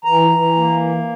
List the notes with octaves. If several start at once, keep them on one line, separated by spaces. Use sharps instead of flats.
E3 A#5
E3
A#3